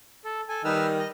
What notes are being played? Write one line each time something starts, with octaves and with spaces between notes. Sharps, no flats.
A4
A4 G#5
D#3 G3 D#4 B4 E6 F6
D#5